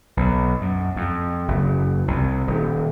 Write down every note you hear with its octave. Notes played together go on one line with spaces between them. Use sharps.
B1
F#2
F2
F#1
C2
D#1